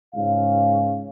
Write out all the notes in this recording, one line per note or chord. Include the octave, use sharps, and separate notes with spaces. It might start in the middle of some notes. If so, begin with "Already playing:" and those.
C#2 G#2 C#4 F5